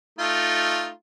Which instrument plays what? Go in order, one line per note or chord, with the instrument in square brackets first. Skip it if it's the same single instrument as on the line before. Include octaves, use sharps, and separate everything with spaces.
[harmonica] A3 D#4 F4